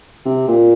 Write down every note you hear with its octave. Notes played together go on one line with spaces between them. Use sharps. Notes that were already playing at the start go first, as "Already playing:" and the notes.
C3
A#2